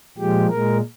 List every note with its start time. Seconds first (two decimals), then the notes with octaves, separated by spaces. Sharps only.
0.17 A#2 F3 G#3 G4
0.49 A#2 G#3 A#4